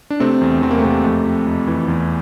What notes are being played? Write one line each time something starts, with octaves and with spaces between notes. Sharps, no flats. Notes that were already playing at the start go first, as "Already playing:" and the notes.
D4
C3 A3 C4
E2
E2 C4
A#3
A3
C3 A#3
F2 A3
F2
F2
E3
E2